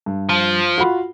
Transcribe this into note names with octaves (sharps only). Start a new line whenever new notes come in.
G2
F3
F4 F#4 B5